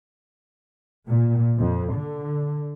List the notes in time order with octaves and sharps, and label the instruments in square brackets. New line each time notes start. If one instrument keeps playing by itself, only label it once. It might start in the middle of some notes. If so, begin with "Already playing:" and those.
[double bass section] A#2
F2
D3